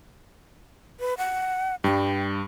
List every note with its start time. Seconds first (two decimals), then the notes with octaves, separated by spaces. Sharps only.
1.00 B4
1.18 F#5
1.84 G2 G3 G5